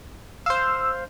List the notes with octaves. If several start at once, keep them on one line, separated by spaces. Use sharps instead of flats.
C5 F5 E6